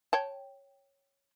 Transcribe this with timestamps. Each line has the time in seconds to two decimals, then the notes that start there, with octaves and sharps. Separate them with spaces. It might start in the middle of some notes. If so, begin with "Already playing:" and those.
0.13 C#5 G5 A5